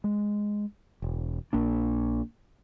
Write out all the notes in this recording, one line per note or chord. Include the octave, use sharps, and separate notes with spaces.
G#3
E1
A#1 A#3 D4